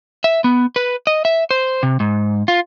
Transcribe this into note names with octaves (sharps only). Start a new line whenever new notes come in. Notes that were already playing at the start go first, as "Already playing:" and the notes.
E5
B3
B4
D#5
E5
C5
C3
G#2
F4